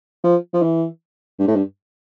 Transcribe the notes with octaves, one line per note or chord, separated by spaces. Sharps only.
F3
F3
E3
G2
A2
G2